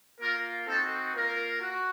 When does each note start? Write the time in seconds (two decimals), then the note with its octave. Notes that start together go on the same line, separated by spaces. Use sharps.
0.20 A#3 F4 A#4
0.67 C4 D#4 F#4 A4
1.15 A#3 F4 A#4
1.61 F#4